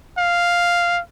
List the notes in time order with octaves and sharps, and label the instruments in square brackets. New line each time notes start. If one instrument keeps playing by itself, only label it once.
[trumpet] F5